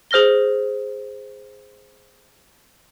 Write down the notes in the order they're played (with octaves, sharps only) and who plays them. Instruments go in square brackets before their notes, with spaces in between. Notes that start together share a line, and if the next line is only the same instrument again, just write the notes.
[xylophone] G#4 C5 F6 A#6 G7